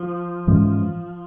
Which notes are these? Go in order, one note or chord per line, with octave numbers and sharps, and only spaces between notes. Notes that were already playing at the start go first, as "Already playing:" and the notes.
Already playing: F3
G#2 E3 G#3 C#4